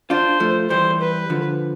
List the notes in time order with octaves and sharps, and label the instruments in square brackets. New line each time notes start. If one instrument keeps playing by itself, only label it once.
[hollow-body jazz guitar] D4 F4 [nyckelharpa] C5
[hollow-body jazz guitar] F3 A3
[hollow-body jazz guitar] E3 G3 [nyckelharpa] C5
[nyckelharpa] B4
[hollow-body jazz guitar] D3 F3